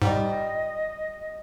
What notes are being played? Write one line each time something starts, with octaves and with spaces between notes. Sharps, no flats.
G#2 G3 F4 G4 D#5